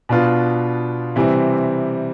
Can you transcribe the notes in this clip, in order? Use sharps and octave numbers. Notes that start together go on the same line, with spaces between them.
B2 B3 D4 F4
C3 E3 G3 C4